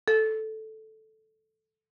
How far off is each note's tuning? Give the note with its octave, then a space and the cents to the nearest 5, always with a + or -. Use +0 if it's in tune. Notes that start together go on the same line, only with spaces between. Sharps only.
A4 -5